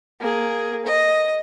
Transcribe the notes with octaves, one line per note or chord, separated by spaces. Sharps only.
A#3 G#4
D#5